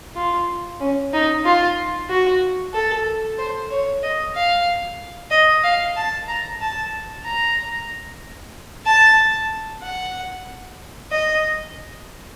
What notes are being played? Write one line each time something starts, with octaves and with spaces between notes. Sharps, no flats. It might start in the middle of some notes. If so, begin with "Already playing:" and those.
F4
C#4
D#4
F4
F#4
A4
C5
C#5
D#5
F5
D#5
F5
A5
A#5
A5
A#5
A5
F#5
D#5